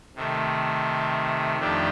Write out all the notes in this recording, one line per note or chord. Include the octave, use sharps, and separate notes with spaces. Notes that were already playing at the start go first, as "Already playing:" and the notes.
C3 D#3 A3
F2 D#3 A3 D4 G4